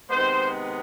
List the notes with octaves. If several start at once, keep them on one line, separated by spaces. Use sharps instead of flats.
C3 D#3 G#3 B3 C5